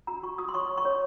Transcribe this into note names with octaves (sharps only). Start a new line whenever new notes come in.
F#4 A#5
F#4 C#6
F#4 D#6
C6
C#5 C#6
C#5
C#6
C#5